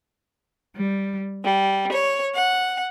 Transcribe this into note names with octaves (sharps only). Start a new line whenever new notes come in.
G3
G3
C#5
F#5